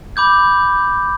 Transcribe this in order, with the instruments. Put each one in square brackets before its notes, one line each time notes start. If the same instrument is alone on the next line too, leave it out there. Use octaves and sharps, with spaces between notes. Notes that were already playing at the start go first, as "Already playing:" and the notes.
[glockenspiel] B5 D6 G6 G#6